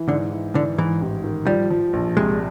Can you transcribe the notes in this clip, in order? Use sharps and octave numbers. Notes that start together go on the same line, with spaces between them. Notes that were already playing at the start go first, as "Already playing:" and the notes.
Already playing: E3
G#2 D3
E3
D3 E3
G#2 E3
A1
D#3
F3 G3
F3
A#1
C2 G#3